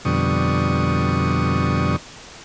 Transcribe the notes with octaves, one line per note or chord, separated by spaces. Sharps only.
F2 B2 D3 G3 C#6 D#6